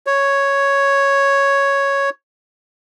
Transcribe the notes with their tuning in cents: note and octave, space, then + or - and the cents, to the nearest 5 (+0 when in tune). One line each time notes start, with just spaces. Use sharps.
C#5 +0